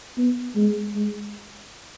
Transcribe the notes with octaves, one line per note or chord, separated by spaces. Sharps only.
B3
G#3
G#3